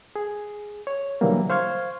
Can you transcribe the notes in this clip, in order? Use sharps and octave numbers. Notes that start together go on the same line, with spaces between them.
G#4
C#5
B2 D3 E3 F#3 G3 A#3
C5 F5 C6 C#6 F6 G#6